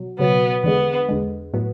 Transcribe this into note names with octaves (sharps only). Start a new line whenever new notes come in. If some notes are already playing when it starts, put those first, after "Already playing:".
Already playing: B2 F#3
C#2 B2 F#3 B3
E2 D3 G#3 B3
E2 D3 G#3
A2 F#3 B3